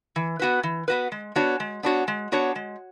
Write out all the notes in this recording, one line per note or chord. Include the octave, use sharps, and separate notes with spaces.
E3
B3 F#4 B4
E3
B3 F#4 B4
G#3
B3 D4 F#4 C#5
G#3
B3 D4 F#4 C#5
G#3
B3 D4 F#4 C#5
G#3